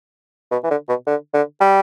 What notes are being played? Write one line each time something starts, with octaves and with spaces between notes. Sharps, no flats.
B2
E3
D3
B2
D3
D3
G3